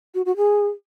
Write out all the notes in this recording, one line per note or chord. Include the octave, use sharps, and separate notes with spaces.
F#4
F#4
G#4